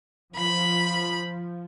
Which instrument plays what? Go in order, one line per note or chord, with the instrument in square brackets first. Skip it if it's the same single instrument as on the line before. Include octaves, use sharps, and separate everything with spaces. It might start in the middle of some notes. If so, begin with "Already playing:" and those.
[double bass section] F3 [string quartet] B5